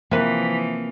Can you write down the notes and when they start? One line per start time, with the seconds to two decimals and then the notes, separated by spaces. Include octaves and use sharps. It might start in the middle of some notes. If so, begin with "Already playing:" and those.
0.11 C3 E3 F3 A#3 B4